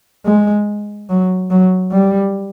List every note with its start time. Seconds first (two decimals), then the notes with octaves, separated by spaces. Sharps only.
0.26 G#3
1.09 F#3
1.50 F#3
1.92 G3